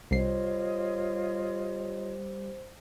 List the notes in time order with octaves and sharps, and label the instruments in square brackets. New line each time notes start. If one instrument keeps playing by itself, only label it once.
[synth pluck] C2 C7 [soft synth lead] G3 [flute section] F4 C#5 D#5 [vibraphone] C5